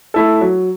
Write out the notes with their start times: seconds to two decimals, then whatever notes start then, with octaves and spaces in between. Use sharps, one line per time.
0.14 A3 E4 A4
0.41 F#3